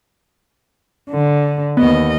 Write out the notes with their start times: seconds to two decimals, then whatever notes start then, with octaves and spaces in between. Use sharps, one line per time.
1.10 D3
1.77 D#2 B3 D#5